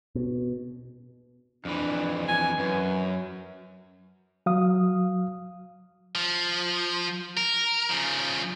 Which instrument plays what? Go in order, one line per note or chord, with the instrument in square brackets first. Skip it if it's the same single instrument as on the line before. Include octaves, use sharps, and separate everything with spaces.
[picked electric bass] B2
[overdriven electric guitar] F2 E3 [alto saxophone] D4
[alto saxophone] G#5
[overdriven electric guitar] F#2 [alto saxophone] B4
[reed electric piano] F#3 F5 D#6
[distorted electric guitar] F3
A#4
C#3 F3